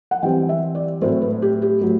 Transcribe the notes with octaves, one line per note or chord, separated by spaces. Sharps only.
F#5
E3 G3 C4 G5
E5
D5
A2 F#3 A3 C4 C5
B4
G4
G4
A2 F#3